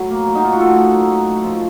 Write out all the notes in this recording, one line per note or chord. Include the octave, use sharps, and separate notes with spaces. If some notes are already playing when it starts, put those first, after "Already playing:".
Already playing: A2 F#3
A#3
F#3
D#4
A2 F4
F#4
A2 A4
A#3
F#3
A2
F#2
F3